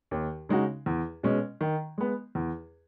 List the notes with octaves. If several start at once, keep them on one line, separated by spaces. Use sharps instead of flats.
D#2
C#3 G#3 D#4 F#4
E2
B2 G#3 C#4
D#3
G#3 B3
E2